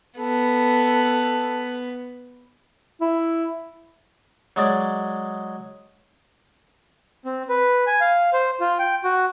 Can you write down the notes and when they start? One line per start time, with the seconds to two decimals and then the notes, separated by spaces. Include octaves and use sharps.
0.18 B3 A4
3.01 E4
4.56 F#3 G#3 D5
7.25 C4
7.49 B4
7.87 G#5
8.01 F5
8.33 C5
8.60 F4
8.79 G5
9.04 F#4